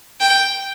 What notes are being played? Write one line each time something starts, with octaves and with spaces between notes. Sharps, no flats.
G5